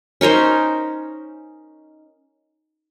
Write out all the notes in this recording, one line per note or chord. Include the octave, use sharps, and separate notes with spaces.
C#4 D#4 A#4 C5